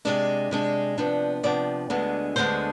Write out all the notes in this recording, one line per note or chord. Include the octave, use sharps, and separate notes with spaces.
C3 G#3 D4 D5
C3 G#3 D4
C3 F3 B3 D4
C3 F3 B3 D4 D5
D2 D3 G#3 B3 D4
D2 D3 G#3 B3 D4 C5